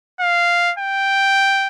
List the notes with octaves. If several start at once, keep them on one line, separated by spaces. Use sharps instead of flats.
F5
G5